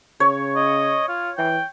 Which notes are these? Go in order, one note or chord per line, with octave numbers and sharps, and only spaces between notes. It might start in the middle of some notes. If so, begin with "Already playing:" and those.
C#3 C#5
D#5
F4
E3 G5